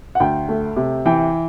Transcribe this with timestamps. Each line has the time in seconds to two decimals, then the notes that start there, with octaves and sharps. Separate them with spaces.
0.15 F#5
0.20 D2 G5
0.49 A3
0.76 C3
1.06 E3 G5